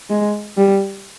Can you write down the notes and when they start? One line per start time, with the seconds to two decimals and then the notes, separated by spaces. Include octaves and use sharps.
0.10 G#3
0.57 G3